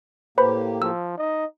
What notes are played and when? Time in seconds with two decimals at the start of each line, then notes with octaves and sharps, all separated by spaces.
0.38 A2 A#3 G4 B4 C5 B5
0.82 F3 E6
1.17 D#4 D#5